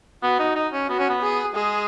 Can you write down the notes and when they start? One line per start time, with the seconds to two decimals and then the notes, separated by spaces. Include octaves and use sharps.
0.23 B3 F#4
0.39 D#4
0.56 D#4
0.73 C#4
0.89 B3 F#4
0.99 C#4
1.09 B3
1.22 G#4
1.55 G#3 G#4